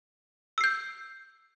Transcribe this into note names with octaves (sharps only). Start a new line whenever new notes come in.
E6 G6 C7